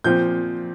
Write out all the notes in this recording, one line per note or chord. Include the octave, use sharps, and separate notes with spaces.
A#2 F3 C4 G6